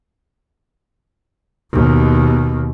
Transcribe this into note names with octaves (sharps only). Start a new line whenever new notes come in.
D#2 B2